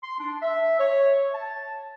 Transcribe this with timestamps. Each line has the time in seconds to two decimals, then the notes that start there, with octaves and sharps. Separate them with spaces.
0.03 C6
0.19 D4
0.42 E5
0.80 C#5
1.34 A5